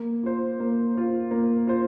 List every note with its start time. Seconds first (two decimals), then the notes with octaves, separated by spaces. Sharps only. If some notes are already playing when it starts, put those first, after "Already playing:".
Already playing: A#3
0.23 F4 C5
0.60 A#3
0.95 F4 C5
1.31 A#3
1.67 F4 C5